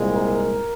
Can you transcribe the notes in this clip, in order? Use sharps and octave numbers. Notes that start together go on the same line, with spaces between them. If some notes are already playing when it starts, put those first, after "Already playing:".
Already playing: C2 A#2 G#3
A#4